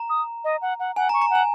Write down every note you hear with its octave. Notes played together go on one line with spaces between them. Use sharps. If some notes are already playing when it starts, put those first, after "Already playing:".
Already playing: A#5
D#6
D#5
F#5
F#5
F#5 G#5
A#5
C#6
A#5
F#5 G#5